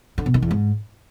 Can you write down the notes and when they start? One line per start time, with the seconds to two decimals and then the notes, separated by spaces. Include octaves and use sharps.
0.18 D3
0.26 B2
0.34 D#3
0.42 E2
0.51 G#2